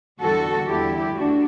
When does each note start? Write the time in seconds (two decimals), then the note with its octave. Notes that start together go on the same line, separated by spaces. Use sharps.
0.20 E2 D3 G3 F#4 A4
0.68 E2 D3 G3 E4 G4
1.16 D2 D3 D4 F#4